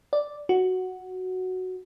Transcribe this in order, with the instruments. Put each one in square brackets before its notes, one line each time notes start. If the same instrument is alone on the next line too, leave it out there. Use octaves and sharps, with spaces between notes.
[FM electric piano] D5
F#4